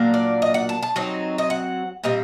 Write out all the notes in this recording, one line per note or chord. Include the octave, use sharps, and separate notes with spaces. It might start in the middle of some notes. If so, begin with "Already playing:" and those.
Already playing: A#2 F#3 A#3 D4
D5
D#5
F#5
A5
A5
F#3 C4 D#4
D#5
F#5
A#2 G3 C4 D#5